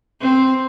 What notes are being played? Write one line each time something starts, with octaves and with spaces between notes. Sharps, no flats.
C4